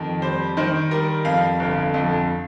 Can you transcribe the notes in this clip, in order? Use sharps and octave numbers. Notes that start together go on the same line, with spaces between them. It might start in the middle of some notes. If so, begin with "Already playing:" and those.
Already playing: F2 D#3
G3 C5
D#3 C5
G3 A#4
F2 F5
G1
F2